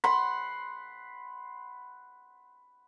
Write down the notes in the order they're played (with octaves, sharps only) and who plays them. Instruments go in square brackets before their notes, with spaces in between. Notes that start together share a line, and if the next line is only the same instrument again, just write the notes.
[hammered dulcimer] F#5 B5 C6